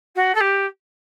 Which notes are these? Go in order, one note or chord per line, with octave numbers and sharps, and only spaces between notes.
F#4
A4
G4